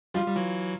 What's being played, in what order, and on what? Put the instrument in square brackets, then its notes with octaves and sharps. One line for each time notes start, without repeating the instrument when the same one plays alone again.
[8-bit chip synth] F3 G3 [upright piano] F4
[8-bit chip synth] G3
E3 F#3